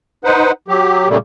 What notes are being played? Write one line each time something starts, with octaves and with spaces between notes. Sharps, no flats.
D#4 B4 C5 F#5
F#3 G4
A#2 C#3 G3 A3 A#3